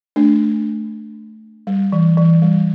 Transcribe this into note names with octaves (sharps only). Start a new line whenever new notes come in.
A3 D4
G3
E3
E3
G3